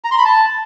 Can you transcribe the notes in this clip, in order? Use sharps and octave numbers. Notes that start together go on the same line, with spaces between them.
A#5
C6
B5
A5